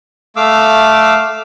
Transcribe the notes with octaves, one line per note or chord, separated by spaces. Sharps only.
A3 F5 D6 E6